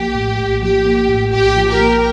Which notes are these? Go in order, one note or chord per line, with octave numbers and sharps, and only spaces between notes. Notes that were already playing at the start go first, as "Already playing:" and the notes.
Already playing: A#1 F3 A#3 G4
A2
A#1
F3 G4
A#3
A2
A#1 G4
F3
G4 A#4
A#3